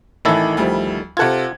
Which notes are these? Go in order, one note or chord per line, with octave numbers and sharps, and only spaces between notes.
A1 D#3 E3 E4 A4
D2 F3 G3
C3 F4 A4 F#5 G#6